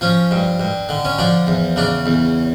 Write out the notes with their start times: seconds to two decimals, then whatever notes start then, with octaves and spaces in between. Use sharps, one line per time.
0.01 F3 C#4
0.31 G2
0.60 G2
0.89 D3
1.05 C#4
1.19 F3 D4
1.47 E2
1.76 C#3 D4
2.06 E2